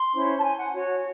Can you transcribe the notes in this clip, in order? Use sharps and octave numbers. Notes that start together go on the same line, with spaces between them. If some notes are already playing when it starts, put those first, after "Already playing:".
Already playing: C6
C#4 E4 C5
A5
G#5
F#5
F#4 C#5